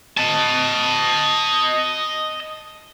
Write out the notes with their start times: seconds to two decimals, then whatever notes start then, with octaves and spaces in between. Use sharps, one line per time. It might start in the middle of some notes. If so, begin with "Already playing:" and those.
0.18 D#5 A5